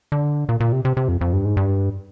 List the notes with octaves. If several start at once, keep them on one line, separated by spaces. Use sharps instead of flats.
D3
A#2
A#2
C3
C3
C3
F2
F2
G2
G#2
G2